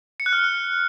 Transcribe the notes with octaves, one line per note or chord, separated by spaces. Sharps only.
C#7
F#6
F6